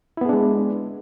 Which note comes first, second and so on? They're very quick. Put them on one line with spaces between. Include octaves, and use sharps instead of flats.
E4 B3 G#4 D4 G#3